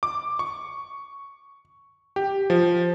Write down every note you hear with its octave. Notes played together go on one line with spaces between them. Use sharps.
D6
C#6
G4
F3